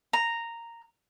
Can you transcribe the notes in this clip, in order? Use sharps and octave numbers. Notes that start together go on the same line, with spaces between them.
A#5